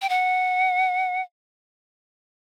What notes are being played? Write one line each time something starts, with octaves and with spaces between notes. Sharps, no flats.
G5
F#5